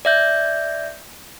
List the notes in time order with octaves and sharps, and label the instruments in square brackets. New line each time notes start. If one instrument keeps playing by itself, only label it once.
[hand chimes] D5 E5 G6